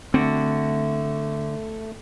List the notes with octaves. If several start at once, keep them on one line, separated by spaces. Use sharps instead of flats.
D3 A3 C4 F#4